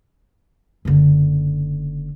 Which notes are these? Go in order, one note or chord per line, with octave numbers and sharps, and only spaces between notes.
F#1 D3